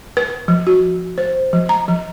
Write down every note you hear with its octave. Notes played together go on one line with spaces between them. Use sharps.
B4
F3
F#4
C5
F3
A#5
F3